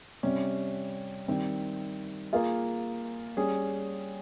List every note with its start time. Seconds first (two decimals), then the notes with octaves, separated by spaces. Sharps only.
0.23 C3 G3 C#4
1.28 D#3 G3 C4
2.33 A#3 F4 G#4
3.37 G3 C#4 G#4